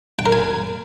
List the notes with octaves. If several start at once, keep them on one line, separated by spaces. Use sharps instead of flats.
G5
A#4
G#5